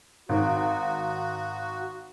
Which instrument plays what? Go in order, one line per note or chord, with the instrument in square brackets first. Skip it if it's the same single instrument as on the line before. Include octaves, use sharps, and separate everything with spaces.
[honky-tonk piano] G#1 [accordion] F#4